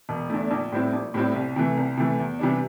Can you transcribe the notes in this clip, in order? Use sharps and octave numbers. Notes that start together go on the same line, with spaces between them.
E1
E2 D3 A3
A#1
A2 G3 C4 E4
A#1
A2 G3 C4 E4
C2
C3 E3 A3
C2
C3 E3 A3
E2
C3 E3 G3 D4